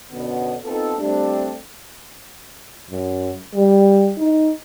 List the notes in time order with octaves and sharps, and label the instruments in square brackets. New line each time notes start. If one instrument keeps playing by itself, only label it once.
[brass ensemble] F#2 B2 D3 F#3 B3
B3 C4 D#4 F4 A4
G3 A3 C4 D4
[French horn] F#2
G3
D#4